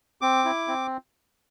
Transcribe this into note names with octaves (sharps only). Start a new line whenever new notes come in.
C4 D6
E4
C4